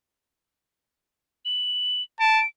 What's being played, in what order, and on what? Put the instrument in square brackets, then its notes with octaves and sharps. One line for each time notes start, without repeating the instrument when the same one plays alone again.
[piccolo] F#7
[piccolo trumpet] A5 [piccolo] D7